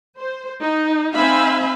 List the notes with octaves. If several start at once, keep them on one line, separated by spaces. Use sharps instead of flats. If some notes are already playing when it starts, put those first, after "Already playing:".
C5
D#4
C4 D#4 E5 F5 G#5 B5